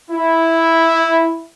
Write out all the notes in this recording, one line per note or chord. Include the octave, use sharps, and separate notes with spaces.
E4